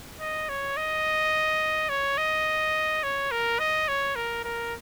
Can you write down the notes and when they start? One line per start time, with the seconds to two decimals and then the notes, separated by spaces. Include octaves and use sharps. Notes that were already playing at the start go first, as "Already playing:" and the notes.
0.20 D#5
0.49 C#5
0.77 D#5
1.89 C#5
2.18 D#5
3.03 C#5
3.31 A#4
3.59 D#5
3.88 C#5
4.16 A#4
4.44 A#4